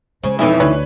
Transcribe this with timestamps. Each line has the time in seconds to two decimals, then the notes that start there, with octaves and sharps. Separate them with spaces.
0.24 C#3 G#3 C5
0.39 B1 F2 E3 C#4 D#4 E4
0.60 D2 D4 B4 C#5